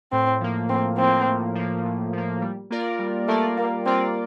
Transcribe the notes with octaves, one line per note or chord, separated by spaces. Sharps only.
A2 C4
F3 A#3
A2 C4
F3 A#3 C4
A2
F3 A#3
A2
F3 A#3
G3
A#3 F4 A#4 D5
G3
A3 A#3 F4 A#4 D5
G3 A#3
A#3 C4 F4 A#4 D5